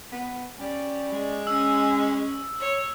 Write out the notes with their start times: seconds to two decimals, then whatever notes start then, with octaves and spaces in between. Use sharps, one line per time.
0.12 B3
0.59 G3 C#4 D5
1.12 G#3
1.47 C#4 E6
2.60 C#5